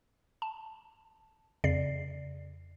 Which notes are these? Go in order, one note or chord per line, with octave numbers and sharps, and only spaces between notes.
A5
F2 C#3 D5 C7